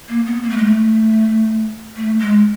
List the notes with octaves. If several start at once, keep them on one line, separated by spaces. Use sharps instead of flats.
A#3
B3
A#3
A3
G#3
A3
A3
G#3